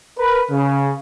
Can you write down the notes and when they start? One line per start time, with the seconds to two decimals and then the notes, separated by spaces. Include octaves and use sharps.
0.19 A#4 B4
0.51 C#3